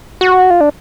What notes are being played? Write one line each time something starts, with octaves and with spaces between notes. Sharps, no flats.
F#4
F4
D4